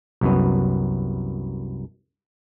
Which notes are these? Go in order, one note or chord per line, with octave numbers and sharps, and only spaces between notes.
C2 F#2 B3